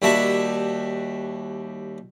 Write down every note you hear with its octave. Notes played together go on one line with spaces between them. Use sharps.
D#2 G3 F#4 E5 A5